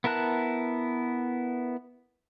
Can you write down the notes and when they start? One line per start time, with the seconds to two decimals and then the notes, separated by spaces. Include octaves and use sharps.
0.04 B3 E4 A#4 A5 F#6